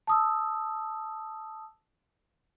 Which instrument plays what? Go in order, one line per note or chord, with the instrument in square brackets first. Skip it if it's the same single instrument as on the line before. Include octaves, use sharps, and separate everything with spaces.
[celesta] A5 D#6 E6